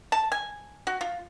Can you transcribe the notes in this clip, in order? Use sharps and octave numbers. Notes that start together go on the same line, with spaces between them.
A5
G#5
F#4
F4